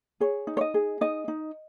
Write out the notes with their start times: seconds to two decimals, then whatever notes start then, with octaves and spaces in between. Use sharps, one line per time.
0.21 G#4 C#5
0.47 D#4
0.57 C#5
0.61 D#5
0.74 G#4
1.01 D#4 D#5
1.28 D#4